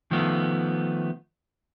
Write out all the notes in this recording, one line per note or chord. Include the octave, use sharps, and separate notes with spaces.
D#3 F3 A3 B3